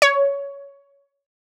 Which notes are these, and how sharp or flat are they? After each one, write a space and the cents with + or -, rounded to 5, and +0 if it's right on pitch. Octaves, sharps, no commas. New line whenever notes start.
C#5 +15